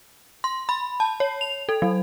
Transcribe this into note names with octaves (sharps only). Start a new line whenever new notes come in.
C6
B5
A5
C#5
F7
A4
F#3